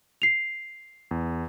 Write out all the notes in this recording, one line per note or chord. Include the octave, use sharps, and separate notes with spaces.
C7 F7
E2